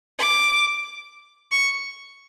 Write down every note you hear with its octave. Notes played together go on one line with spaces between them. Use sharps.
D6
C#6